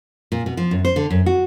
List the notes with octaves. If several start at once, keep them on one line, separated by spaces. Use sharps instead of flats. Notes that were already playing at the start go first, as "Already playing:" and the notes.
A#2
B2
F3
F#2
C5
D3
F#2
F#4